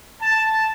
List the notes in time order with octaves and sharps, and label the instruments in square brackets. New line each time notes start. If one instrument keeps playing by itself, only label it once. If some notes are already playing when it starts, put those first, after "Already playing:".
[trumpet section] A5